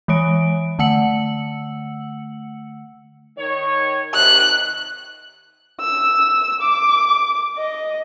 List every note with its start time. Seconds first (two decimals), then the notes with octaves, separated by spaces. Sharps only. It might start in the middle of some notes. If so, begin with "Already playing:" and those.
0.08 E3 G#3 C#5 D7
0.79 D3 A3 F#5 E6 C#7 F#7
3.38 D#3 C#5
4.14 C3 D#3 F#6
5.80 E6
6.61 D6
7.58 D#5